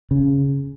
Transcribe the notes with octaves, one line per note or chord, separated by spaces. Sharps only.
C#3